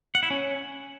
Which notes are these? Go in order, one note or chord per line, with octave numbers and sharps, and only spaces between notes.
F#5
E4
C#4